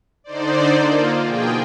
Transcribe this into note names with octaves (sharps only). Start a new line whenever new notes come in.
D3 D#4 C5 D5
A#3 F4
B2 F3 G#4 G5